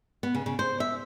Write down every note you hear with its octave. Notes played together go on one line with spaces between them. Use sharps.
B3
C#3
C#3
C5
E5